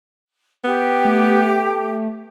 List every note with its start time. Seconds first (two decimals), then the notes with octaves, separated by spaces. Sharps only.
0.64 B3 G4
1.05 A3